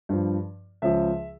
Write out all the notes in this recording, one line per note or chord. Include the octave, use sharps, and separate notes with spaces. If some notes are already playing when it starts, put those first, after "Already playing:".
G2 F3
C#2 C#3 F3 E5